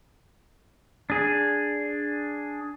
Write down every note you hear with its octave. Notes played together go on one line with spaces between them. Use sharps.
D4 G#4